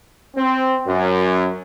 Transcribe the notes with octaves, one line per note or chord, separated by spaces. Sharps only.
C4
F#2